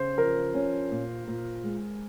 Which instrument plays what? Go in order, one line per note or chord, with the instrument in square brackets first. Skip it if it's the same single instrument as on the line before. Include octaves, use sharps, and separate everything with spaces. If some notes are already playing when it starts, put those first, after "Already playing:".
Already playing: [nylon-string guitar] C#3 [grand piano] C5
[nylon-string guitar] F3 [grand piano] A#4
[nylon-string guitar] C#4
A#2
A#2
G#3